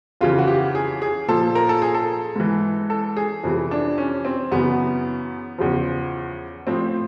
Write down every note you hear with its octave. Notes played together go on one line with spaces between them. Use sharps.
F2 C#3 E3 F4
F#4
G4
G#4
G#4
A#2 F3 A4
A#4
A4
G#4
A4
G#2 E3
A4
G#4
F2 C3 E3
D4
C#4
C4
F#2 C#3 E3 B3
E2 C#3 F3
A2 F3 C4